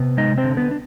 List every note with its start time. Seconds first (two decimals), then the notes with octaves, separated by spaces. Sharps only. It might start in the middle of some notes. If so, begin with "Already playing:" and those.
Already playing: C3 B3
0.17 G#3 D#4 D#5
0.38 C4 C5
0.44 D3
0.57 B3 B4
0.71 D4